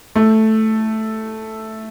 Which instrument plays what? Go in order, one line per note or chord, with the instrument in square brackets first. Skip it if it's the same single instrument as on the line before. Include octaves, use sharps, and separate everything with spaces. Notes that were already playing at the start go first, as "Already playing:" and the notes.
[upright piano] A3